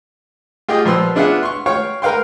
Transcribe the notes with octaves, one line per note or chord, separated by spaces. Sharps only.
F4 G4 G#4 D#5 G5
A#2 F3 B4 C6 E6
B3 D4 E4 F4 G#4 F#5
C6 C#6
C#5 F5 G5 C#6
A#4 B4 F5 G5 C6